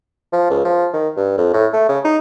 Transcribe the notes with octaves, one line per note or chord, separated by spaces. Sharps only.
F3
C#2
F3
D#3
G2
F2
A2
A3
C#3
D#4